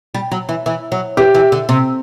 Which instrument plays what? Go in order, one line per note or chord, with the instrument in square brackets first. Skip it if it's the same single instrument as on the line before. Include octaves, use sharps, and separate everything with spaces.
[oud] G3
F#3
E3
E3
F#3
[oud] E3 [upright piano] G4
[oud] E3
D3
C3